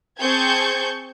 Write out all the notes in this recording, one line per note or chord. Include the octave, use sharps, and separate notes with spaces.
C4 G#4 A5 C#6 G6 G#6